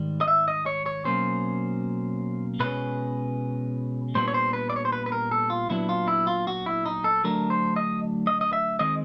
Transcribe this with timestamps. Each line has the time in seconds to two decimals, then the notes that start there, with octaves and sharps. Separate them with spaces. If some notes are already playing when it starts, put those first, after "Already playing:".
Already playing: G#2 D#3 G3
0.21 D#5
0.28 E5
0.48 D#5
0.66 C#5
0.86 C#5
1.05 B2 F#3 A#3 C#4 C5
2.60 B2 G#3 C#4 B4
4.15 A#2 G3 B3 D4 C5
4.28 C#5
4.34 C5
4.53 B4
4.70 D5
4.76 C#5
4.85 C5
4.92 B4
5.06 B4
5.12 A#4
5.31 A4
5.50 F4
5.69 A#2 F#3 B3 D4 E4
5.89 F4
6.08 E4
6.27 F4
6.47 F#4
6.66 E4
6.86 D#4
7.04 A4
7.24 D3 F#3 A3 D4 A#4
7.50 C5
7.76 D#5
8.27 D#5
8.41 D#5
8.53 E5
8.79 D#3 G#3 C4 D#5